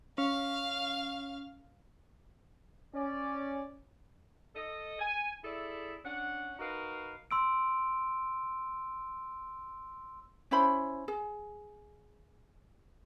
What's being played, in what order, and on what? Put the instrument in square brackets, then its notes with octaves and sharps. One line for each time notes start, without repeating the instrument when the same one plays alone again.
[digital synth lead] C#4 [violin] F5
[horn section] C#4 D5
A4 D#5
G#5
E4 G#4 A4 D5 E5
C#4 D4 F#5
D#4 F#4 A#4 B4 F5
[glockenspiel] C6 E6 D7
[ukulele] C#4 E4 C5 B5
G#4